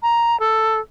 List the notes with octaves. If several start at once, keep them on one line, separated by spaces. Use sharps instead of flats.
A#5
A4